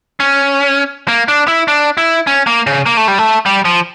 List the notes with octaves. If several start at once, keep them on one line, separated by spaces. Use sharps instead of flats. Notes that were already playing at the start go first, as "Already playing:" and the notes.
C#4
A#3
D4
E4
D4
E4
C#4
A#3
C#3
A#3
A3
G3
A3
G3
F3